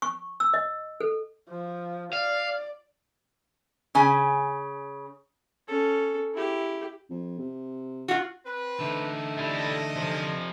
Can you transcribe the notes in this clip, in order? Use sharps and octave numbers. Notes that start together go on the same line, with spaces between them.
C#6
E6
D#5
A4
F3
D5 F5
C#3 G#5
C#4 A4
E4 G4
F2
C3
F4 F#4
C4 B4
D3 A3 D#4
G3 D4 E4 A4 D#5
C3 F3